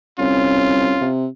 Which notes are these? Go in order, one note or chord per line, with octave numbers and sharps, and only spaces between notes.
C2 C#4 F4
C3